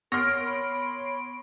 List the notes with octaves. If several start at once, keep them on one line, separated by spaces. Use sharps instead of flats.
B3 A#4 C#5 C6 F6 A#6 D7
B5